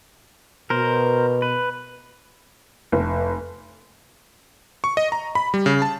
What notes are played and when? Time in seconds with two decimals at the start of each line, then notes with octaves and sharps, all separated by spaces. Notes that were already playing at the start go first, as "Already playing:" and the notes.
0.70 B2 A#4 C5
1.42 B4
2.92 F1
4.84 C#6
4.97 D#5
5.12 A#5
5.35 B5
5.54 G3
5.66 C#3
5.82 A5